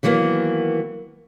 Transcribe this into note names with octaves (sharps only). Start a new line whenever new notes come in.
D#3 E3 F#3 A#3 B3